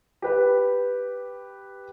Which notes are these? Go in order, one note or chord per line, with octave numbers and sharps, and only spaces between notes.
G4 B4